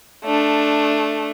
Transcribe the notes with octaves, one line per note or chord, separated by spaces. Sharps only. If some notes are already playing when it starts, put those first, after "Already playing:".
A3 D4